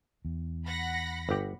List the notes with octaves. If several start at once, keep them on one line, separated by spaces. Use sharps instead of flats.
E2
F#5 B5 A#6
G1 G4